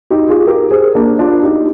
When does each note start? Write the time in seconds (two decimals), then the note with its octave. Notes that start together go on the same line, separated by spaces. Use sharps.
0.10 D#4 G4
0.29 F4 G#4
0.47 G4 A#4
0.71 G#4 C5
0.95 A#3 D4
1.19 D4 F4
1.43 D#4 G4